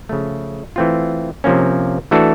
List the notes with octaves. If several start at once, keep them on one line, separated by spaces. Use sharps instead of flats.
C#3 F3 A3
E3 A3 C4 F4
C3 F3 A#3 C#4
E3 A3 D4 F#4 A4